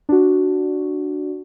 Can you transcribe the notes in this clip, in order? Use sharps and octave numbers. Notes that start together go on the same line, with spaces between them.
D4 F#4